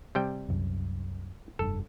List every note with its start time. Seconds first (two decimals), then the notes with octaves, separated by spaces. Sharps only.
0.15 C3 G3 G5
0.49 C2 F#2
1.59 F1 G2 A4